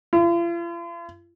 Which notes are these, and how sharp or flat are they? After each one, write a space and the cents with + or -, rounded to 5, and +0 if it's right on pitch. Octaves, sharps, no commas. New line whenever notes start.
F4 -45